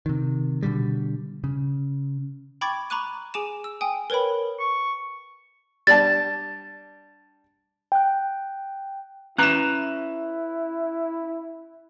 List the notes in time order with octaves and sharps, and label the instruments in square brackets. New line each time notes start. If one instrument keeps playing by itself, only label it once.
[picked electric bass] C3 D#3
B2 D3 G3
C#3
[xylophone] G5 B5 C#6 D6 G#6 A6
A#5 B5 C#6 D6 F#6 D#7
G#4 G#5 D6 D7 E7
E6
G5 G#5 D#6
A#4 B4 C#5 G5 B5
[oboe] C#6
[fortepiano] G3 D4 A5 [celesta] A6
[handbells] G5 F#6
[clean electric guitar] C#4 B4 A#5 [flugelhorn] E4 [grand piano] F#6 E7